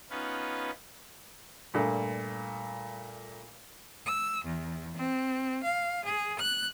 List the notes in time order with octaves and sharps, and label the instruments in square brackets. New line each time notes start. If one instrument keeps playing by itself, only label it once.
[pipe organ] B3 C#4 D#4 F4 B4
[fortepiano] G2 A#2 A3
[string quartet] E6
E2
C4
F5
G#4
F#6